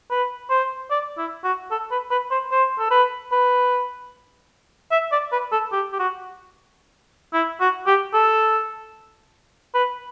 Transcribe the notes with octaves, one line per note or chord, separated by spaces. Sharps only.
B4
C5
D5
E4
F#4
A4
B4
B4
C5
C5
A4
B4
B4
E5
D5
B4
A4
G4
G4
F#4
E4
F#4
G4
A4
B4